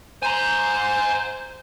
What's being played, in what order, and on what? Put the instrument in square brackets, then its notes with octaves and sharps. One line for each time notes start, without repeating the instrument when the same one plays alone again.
[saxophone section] C5 [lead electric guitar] G#5 A#5